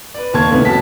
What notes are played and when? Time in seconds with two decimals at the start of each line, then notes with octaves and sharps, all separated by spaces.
0.14 B4 D5
0.34 D#2 A#3 A5 C#6 G#6
0.51 C#2 A2 C3 D#3 B3
0.65 F#1 F#4 A5 B6